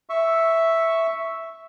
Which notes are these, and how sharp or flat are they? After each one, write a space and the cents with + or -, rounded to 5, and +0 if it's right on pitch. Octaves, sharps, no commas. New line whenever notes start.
E5 +0 C#6 +0